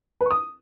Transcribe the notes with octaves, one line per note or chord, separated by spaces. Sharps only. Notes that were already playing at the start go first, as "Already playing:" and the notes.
B4
C#6
D#6